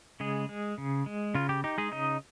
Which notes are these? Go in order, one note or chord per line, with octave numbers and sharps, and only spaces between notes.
C#3 G#3 G#4
G#3
C#3
G#3
C#3 F4
G4
D#4 G4
G#3 G#4
C#3 D#4 D#5